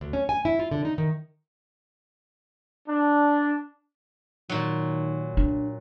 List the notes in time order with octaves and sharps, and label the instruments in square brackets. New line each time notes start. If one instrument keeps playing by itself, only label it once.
[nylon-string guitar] D2
C#4
G#5
E4
F4
D3
D#4
D#3
[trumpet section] D4
[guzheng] A#2 F#3 [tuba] D#3
[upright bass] D4